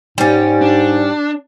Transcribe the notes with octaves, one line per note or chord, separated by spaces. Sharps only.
G#2 G3 C#4
D4